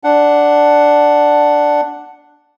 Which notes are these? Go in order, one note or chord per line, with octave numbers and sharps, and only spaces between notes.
D4 F#5